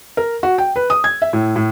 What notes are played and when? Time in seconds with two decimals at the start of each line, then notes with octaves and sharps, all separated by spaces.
0.17 A#4
0.43 F#4
0.58 G5
0.76 B4
0.90 D#6
1.04 G#6
1.22 E5
1.33 A2
1.56 A2